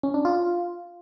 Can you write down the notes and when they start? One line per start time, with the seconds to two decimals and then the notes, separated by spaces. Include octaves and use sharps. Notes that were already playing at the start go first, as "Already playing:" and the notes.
0.03 C#4
0.14 D4
0.25 F4